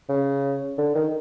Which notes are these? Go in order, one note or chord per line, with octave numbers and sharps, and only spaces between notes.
C#3
D3
D#3